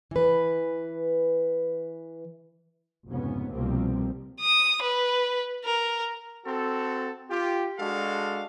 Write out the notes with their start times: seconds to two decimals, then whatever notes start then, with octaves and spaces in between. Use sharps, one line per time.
0.11 E3 B4
3.08 F1 C#2 G#2 C3 B3 C#4
3.53 C2 B2 F3 G3 A#3 C4
4.40 D#6
4.82 B4
5.65 A#4
6.46 C4 F#4 A4
7.30 F4 G4
7.79 G#3 D4 F#4 A4 F5